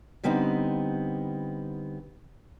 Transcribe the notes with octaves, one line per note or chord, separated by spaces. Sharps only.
D3 G3 B3 C4 D#4